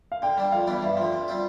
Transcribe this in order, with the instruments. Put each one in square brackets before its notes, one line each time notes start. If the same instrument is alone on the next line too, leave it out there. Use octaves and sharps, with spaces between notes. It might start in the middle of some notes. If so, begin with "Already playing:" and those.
[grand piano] F5
[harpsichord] D3 [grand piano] G5
[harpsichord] G3 D4
[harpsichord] F2 [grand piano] F5
[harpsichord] E3 G3 B3 D4
[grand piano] D5
[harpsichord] G2 [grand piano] E5
[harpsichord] D3 F3
C3
G3 C4 F4